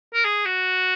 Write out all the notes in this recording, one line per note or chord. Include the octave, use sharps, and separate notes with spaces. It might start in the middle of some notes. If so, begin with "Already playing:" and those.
A#4
G#4
F#4